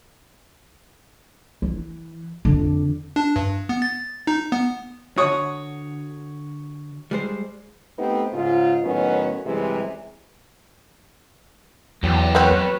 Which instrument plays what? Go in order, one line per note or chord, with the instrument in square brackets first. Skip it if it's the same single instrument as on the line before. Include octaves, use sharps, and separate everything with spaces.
[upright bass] E3
F2 D3
[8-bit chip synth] D4
G2
B3
A6
D#4
B3
[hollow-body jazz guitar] D3 F#4 [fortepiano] C#5 D#6
[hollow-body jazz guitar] G3 G#3 C5
[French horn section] A3 B3 C4 D#4 G4
G#2 C#3 F4
A2 D#3 F#3 B3 C#4
F#2 C3 E3 G3 G#3
[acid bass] E2 [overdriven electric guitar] F#3 G4
[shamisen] B3 C4 [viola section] B4 C#5